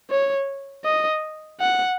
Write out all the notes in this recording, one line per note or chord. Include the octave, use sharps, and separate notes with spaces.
C#5
D#5
F#5